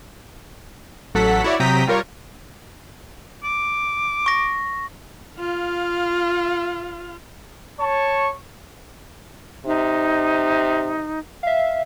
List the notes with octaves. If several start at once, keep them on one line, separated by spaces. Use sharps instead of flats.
A1 F#3 A4 F#5 B6
E4 F#4 C#5 D5
C3 F#3 G5 A#5 D#6 B6
G3 F4 A#4 C#5
D6
C#6 A#6
F4 F5
C#5 A5 C#6
C3 D#4
E5 F5